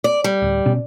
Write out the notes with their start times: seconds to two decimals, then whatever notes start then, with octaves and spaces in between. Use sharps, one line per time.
0.04 D5
0.24 G3
0.42 D1
0.66 B2 C#4